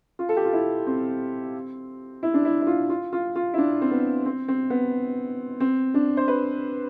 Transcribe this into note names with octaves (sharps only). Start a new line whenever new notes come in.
F4
A4
G4
F4
E4
C4
E4
D4
E4
E4
F4
F4
F4
F4
E4
D4
C4
B3
C4
C4
B3
C4
D4
C5
B4